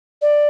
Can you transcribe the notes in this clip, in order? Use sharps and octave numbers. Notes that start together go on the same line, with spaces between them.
D5